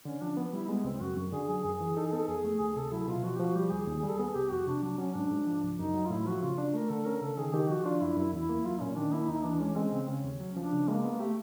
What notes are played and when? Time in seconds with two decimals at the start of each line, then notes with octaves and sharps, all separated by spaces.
0.05 D3 C#4
0.21 F3 D4
0.37 B3
0.53 G3 E4
0.69 G#3 B3
0.84 C#2 C4
1.01 F#2 F#4
1.17 F#2
1.32 D3 G#4
1.49 F#3 G#4
1.64 F#2 G#4
1.81 E3
1.97 D#4 A4
2.06 G#4
2.12 B3 A4
2.28 F2 G#4
2.45 A3
2.60 D2 G#4
2.76 C3 A4
2.92 F#3 E4
3.08 B2 F4
3.24 F3 F#4
3.36 G4
3.40 F3 F#4
3.55 G3 G4
3.72 D#2 G#4
3.88 D#2
3.99 G3 G#4
4.09 A4
4.19 B3 G#4
4.35 C2 G4
4.51 F2 F#4
4.67 C3 D4
4.83 F#3 D4
4.98 F#3 C#4
5.14 G#2 D4
5.31 G#2
5.47 F3
5.63 C#2
5.78 F#2 D#4
5.94 F#3
6.06 F4
6.10 A2 E4
6.26 F3 F#4
6.42 C#3 F4
6.58 D4
6.74 A3 A#4
6.90 D3 A4
7.06 C#4 A#4
7.21 C#3 A4
7.38 D#3 G#4
7.53 D#3 G4
7.69 F3 F#4
7.85 D4 F4
8.01 F#2 E4
8.17 F#2 E4
8.33 E2 E4
8.49 A#3
8.65 F#3 F4
8.81 A#2 C#4
8.97 D#3 D4
9.13 A#3 E4
9.28 D2 D#4
9.45 E3 D4
9.60 G#3 C#4
9.76 G#3 C4
9.93 C#3 C4
10.08 C#3 C#4
10.24 D#2
10.40 F#3
10.57 F3 D4
10.72 C#3
10.88 G#3 A#3
11.04 B3
11.20 A3 G4